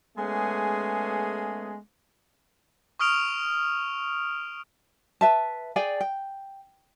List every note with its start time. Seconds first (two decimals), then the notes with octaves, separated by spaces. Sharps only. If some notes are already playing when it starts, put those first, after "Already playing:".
0.17 G#3 A3 B3 C#4 G#4
2.99 C#6 D#6 F6 D7 F7
5.21 B4 E5 A5
5.76 G#4 D5 G5 G#5
6.01 G5